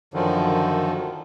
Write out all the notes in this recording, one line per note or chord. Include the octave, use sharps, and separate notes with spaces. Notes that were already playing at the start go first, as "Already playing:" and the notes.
F#2 D3 D#3 F3